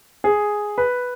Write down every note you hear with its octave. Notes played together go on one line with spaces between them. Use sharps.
G#4
B4